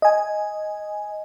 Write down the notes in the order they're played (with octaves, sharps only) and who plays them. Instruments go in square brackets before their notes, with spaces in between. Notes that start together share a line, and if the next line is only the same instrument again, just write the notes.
[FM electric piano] D#5 G#5